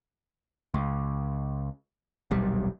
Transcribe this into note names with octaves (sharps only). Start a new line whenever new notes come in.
C#2
D#1 B1 G3